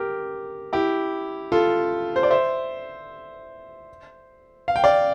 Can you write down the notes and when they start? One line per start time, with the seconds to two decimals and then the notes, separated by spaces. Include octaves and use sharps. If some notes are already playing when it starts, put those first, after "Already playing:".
Already playing: G4 A#4
0.73 E4 G4
1.52 F4 A4
2.16 C5
2.23 D5
2.31 C5 E5
4.68 F5
4.76 G5
4.84 D5 F5